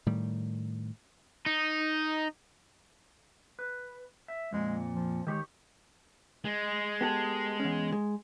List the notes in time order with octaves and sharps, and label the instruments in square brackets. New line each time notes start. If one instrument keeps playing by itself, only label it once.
[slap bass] A2 D#3 G3
[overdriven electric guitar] D#4
[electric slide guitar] B4
E5
[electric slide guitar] F2 A#2 [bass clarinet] G#3
[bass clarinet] F3
[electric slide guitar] D#3 G4 C#5 [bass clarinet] G#3
[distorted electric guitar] G#3
[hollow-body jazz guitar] B3 G4 A4
E2 C#4
G#3